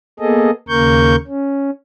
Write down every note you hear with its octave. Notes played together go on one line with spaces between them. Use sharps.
A#3 B3 G#4 A4 D#5
D#2 C#3 A#3 A#4 C#6 G6
C#4